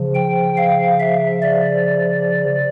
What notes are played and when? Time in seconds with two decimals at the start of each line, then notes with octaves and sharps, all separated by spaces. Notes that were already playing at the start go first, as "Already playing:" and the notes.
Already playing: C#3 F3
0.15 G5
0.57 F5
1.00 E5
1.42 D5